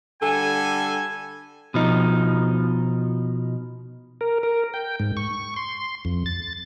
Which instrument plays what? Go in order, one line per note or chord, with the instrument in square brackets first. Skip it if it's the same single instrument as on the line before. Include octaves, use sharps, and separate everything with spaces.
[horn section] D3 G3 A4 G#5
[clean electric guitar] B2 F3 D#4
[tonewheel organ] A#4
A#4
G5
G#2
C#6
C6
F2
A6